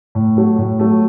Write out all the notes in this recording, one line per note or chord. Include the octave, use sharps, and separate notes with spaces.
A2
F#3 A3
A2
F#3 A3